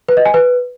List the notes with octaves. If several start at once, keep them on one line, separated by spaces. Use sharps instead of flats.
B4
D#5
G#5
B4